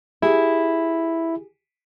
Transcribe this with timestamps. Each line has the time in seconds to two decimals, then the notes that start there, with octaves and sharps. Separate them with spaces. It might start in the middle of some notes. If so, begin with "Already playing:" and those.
0.22 E4 G4 G#4